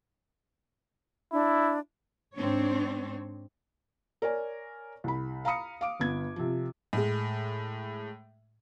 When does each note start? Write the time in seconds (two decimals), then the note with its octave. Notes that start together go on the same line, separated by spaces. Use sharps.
1.33 D4 E4
2.35 G#2 C4 D4 C#5
4.22 A#4 C#5 D5 G#5
5.04 C2 B5
5.45 F5 A#5 B5 D#6 C#7
5.81 F5 D6 D7
5.99 G1 B3 G#6
6.36 C3 F3
6.93 A2 G#3